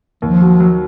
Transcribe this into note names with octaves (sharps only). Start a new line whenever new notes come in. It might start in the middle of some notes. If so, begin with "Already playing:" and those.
D#2 F3
F#3
F#3